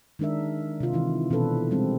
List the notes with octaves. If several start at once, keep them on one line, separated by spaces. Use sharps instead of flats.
D#3 G#3 D4 A#4 E5
C3 F4
D#3 E3 E4
B2 E3 C4 D4 A4 B4
G3 G#3 C4